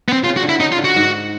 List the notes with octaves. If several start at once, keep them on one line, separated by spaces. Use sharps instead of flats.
B3
C4
C#3 F4
F#4
D3
E4
C#3 D#4
F4
D3
F#4
G#2